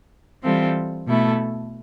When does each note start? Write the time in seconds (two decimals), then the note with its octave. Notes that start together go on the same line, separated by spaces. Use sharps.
0.42 E3 G3 C4 F4 A4
1.07 B2 A3 E4 A4